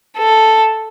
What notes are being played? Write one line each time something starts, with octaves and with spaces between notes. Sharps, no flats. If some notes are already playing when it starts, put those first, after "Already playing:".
A4